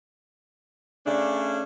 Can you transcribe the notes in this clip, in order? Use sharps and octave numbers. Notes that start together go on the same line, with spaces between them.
C#3 A3 C#4 D4